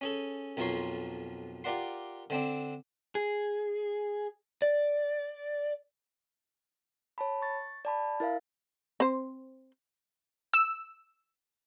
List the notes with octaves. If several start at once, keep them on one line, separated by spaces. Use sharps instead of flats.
C#4 G#4 A4
B1 F2 F3 A#4 C#5 C6
F4 G4 A#4 D5 F#5 C6
D3 C4 D4
G#4
D5
C#5 A5 B5
C#6 A6
D5 A5 B5
E4 A#4 E5 F5
C4 C5
E6